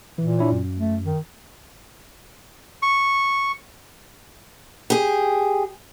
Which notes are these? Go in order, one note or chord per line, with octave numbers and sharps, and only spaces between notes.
A#2 E3
D4 E4 C#5
F#2
A3
D#3
C#6
G4 G#4